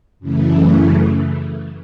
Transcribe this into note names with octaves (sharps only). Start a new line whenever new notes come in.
F#2 C#3 E3 A3